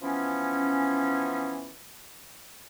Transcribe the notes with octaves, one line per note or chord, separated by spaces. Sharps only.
E3 F3 B3 C#4